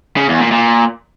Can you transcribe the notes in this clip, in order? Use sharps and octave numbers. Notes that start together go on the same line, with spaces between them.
C#3
E2
A#2
A#2